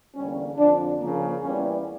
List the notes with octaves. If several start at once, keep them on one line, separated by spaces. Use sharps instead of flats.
E2 D3 G3 A#3 C#4
F2 D3 F3 D4
C#3 F3 A#3
E2 E3 G3 A#3 C#4